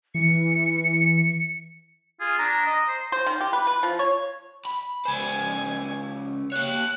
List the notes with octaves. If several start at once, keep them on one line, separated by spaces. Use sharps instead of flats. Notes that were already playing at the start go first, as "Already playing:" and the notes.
E3 C#7
F4 G#4
D4 A#5
D#5
C5
C5
D#3
G4
B4
B4
F3
C#5
B5
C#2 C5 G#5
A#3 C#5 F#6